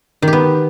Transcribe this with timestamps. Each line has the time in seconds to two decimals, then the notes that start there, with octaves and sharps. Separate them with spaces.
0.22 D#3
0.28 G4
0.33 B3